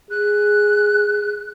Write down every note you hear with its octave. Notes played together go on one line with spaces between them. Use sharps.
G#4 F#6